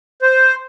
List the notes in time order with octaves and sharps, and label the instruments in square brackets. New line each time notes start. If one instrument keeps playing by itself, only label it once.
[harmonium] C5